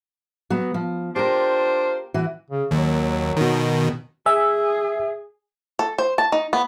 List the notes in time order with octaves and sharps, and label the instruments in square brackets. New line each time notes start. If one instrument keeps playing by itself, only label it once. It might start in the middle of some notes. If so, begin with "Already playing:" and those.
[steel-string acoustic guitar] F#3 B3
F3
[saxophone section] D4 F4 C5 [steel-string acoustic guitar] G4 A#4
[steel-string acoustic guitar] E3 F#4
[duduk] C#3
[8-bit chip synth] D#2 [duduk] F#3
[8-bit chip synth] B2 D#3
[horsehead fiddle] G#4 [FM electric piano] E5 [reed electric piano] G#5
[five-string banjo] A4
C5
A5
D#4
B3